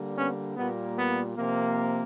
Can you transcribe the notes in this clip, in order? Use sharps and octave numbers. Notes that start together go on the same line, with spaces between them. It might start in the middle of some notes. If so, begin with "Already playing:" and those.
Already playing: D3 G3 A#3
B3 C#4
A#2 G3 A#3 B3
B3
C3 F3 A#3